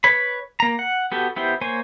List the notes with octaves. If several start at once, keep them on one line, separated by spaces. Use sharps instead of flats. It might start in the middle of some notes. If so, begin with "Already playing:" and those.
B4 C#5 B5
A#3 A#5
F#5
B3 F#4 G4 A4
B3 E4 G4 C5
A#3 C5 C#5 G#5